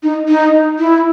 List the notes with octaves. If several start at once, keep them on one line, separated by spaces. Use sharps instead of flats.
D#4
D#4
E4